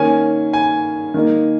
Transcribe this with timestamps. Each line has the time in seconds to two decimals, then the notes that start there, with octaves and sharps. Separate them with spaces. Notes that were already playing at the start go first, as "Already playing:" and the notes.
Already playing: D#3 A#3 C#4 G#5
0.53 G#5
1.14 D#3 A#3 D#4